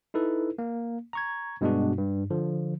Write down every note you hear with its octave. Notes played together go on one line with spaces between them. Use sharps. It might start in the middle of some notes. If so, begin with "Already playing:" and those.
D#4 E4 A4 B4
A#3
A#5 C#6 G#6
G2 B2 G#3 B3 D4 F#4
G2
D3 F3